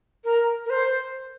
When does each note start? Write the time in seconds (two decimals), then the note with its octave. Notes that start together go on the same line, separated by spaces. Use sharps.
0.24 A#4
0.65 A#4
0.69 C5